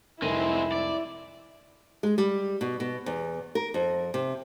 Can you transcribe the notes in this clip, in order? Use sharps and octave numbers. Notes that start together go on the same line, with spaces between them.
F1 C2 G#3 C4 E4 D#7
D5
G#3
G3
B2
B2
E2
A#4
F2
C3